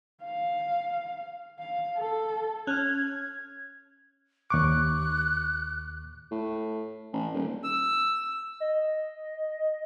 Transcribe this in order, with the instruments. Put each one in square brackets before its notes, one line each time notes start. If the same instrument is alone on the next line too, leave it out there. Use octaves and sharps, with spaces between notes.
[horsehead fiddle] F5
F5
A4
[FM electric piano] C#4 [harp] F6 F#6 [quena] G#6
[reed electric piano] D#2 C#6 D6 [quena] F#6
[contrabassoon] A2
A1
D#1
[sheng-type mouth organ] E6
[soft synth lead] D#5